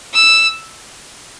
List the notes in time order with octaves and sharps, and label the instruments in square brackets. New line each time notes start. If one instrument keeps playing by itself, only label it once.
[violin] E6